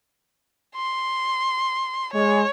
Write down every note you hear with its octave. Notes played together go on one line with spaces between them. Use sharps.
C6
G#3 C#5